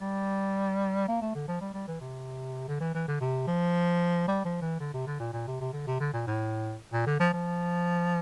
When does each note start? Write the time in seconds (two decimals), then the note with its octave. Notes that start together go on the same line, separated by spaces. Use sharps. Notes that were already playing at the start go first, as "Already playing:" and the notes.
0.01 G3
1.08 A#3
1.22 A3
1.35 D3
1.48 F3
1.61 G3
1.74 G3
1.88 E3
2.01 C3
2.68 D3
2.80 E3
2.94 E3
3.08 D3
3.20 C3
3.47 F3
4.28 G3
4.45 F3
4.62 E3
4.80 D3
4.94 C3
5.06 D3
5.19 A#2
5.33 A#2
5.47 C3
5.60 C3
5.73 D3
5.87 C3
6.00 D3
6.13 A#2
6.27 A2
6.93 A#2
7.06 D3
7.20 F3
7.33 F3